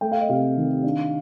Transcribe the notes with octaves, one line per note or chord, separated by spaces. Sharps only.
A3 G5
F5
D#5
C3 F5
D#3
D4